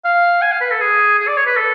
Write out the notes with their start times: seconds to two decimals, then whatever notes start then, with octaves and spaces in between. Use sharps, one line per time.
0.05 F5
0.42 G#5
0.52 F5
0.61 B4
0.71 A4
0.80 G#4
1.19 G#4
1.28 D5
1.37 C#5
1.46 B4
1.56 A4